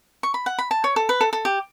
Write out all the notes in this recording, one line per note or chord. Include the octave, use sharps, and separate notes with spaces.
C#6
B5
F#5
B5
A5
C#5
A4
B4
A4
A4
G4